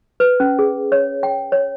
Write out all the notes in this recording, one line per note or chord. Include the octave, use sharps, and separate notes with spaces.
B4
C#4
G#4
C#5
G5
C#5